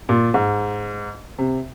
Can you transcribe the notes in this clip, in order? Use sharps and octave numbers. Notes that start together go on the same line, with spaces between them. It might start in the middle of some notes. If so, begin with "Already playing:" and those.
A#2
G#2
C3